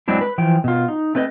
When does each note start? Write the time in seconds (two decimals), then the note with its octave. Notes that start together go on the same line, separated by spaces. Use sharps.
0.08 F#3 G#3 C4 D4 E4
0.21 B4
0.38 E3 F3 G5
0.64 B2 F4
0.88 D#4
1.15 A3 C4 B4 C#5 D#5